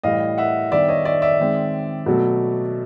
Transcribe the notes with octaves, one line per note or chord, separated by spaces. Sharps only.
A2 E3 G3 D#5 F5
E5 F#5
D#3 G3 B3 D4 D5 E5
C#5 D#5
D5 E5
D5 E5
D#3 G#3 C4
B2 F#3 A3